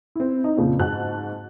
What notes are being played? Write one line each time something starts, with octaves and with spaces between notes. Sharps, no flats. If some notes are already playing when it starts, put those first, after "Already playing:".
C4 E4
D#4
F2 A#2 C#3 F3
G#2 F#4 A5 F#6